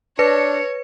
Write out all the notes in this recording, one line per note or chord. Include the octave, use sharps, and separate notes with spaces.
D4 B4 C#5 C#7